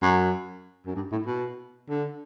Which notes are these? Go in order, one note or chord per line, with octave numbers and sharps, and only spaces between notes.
F#2
F#2
G2
A2
B2
D3